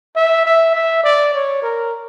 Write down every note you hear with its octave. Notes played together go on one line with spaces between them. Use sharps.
E5
E5
E5
D5
C#5
A#4